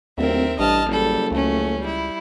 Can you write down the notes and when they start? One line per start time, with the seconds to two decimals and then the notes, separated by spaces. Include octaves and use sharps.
0.18 D1 D#2 C4 A#4 E5
0.59 A1 G2 D#5 A5 F6
0.88 F#1 G3 A4
1.31 C#2 A3 C#4
1.79 G3 E4